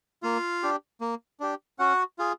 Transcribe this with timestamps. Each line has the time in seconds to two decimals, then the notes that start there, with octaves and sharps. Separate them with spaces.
0.23 A#3 F4 F5
0.63 D4 G4
1.01 A#3
1.40 D4 G4
1.79 C#4 F#4 F#5
2.19 F4 G#4